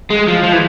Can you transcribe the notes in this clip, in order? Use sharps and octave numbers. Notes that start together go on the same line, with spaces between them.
G#3
F3
F3
E3